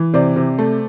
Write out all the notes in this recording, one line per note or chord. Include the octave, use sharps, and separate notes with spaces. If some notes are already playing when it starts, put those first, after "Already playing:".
Already playing: E3
C3 C5 D5
C3
A3